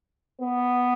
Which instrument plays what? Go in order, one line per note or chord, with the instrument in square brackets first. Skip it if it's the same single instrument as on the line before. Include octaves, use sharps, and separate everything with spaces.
[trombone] B3